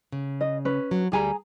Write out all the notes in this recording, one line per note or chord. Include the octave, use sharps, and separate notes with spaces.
C#3
D#5
C#4 B4
F#3
D2 G3 G#4 G#5 A#5